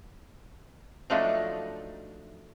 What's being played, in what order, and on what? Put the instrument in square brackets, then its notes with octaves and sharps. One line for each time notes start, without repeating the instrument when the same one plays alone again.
[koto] F3 F#3 A3 D4 D#4